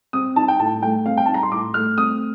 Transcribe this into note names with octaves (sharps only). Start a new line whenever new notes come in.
C4 D#6
D#4 A5
G5
A2 A5
A3 G5
C4 F5
G5
D#4 A5
A#5
C6
A2 D6
A3 F6
C4 D#6